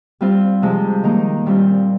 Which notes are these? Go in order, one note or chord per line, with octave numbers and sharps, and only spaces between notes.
G3 C4 F4
C3 F3 G#3
D#3 A#3 D#4
A#2 G3 C4 F4